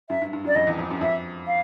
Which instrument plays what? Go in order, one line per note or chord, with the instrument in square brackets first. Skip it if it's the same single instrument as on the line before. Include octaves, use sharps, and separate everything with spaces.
[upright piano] F#2 [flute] E5
[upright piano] G2
G2
F#2
[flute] D5
[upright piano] F2 [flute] D#5
[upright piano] E2
F2
F#2
[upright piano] F2 [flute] E5
[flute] F5